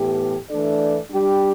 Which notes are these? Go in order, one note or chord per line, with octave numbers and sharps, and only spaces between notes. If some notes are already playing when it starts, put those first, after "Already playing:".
Already playing: A2 E3 B3 G4
E3 A3 D4 A4 D5
G3 D4 G4